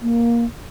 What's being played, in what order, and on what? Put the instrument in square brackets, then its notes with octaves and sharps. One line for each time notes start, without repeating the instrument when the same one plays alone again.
[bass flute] A#3